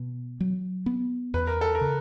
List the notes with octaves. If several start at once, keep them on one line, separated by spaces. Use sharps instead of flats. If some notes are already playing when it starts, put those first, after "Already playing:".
Already playing: B2
F#3
B3
E2 B4
A#4
A4
A#4
C#3